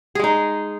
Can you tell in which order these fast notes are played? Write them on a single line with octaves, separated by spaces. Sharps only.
G#4 G#3 D#4